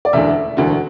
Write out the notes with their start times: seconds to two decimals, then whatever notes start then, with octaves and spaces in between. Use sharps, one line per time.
0.05 D5
0.13 E1 D2 D3 E5
0.57 E1 D2 D3 F#4